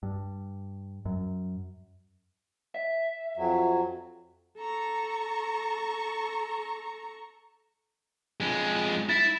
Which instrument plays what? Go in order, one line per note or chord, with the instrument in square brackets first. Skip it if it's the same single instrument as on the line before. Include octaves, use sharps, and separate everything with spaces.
[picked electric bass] G2
F#2
[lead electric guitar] E5
[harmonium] F2 F#3
[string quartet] A4 A#5 C#6
[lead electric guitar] F2 G#3
[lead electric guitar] E4 [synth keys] A6